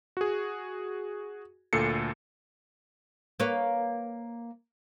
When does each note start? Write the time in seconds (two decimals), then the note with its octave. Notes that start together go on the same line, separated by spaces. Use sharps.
0.17 F#4 G#4
1.73 D2 A#2 A4 C7 C#7
3.40 A#3 B4 C#5